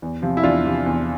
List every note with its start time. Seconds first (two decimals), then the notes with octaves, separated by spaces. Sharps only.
0.02 E2
0.22 C3 F3
0.37 E4
0.43 E2 D4 F4
0.64 C3 F3
0.86 E2